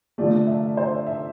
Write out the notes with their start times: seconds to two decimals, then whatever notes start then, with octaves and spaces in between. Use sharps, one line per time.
0.18 D3 F3 A3 D5
0.47 E5
0.77 C5
1.06 E5